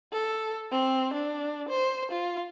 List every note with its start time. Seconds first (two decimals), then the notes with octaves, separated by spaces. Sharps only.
0.13 A4
0.72 C4
1.14 D4
1.69 C5
2.11 F4